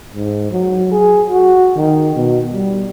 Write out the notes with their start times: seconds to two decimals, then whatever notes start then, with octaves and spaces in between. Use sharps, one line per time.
0.14 G#2
0.51 F#3
0.91 G#4
1.29 F#4
1.76 D#3
2.16 B2
2.53 G3